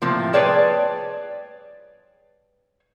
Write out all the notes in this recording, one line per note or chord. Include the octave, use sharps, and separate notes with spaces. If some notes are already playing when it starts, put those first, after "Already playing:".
A2 C3 F3 A#3
G#4 B4 C#5 D5 G5 A5